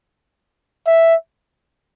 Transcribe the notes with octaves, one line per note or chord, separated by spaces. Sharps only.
E5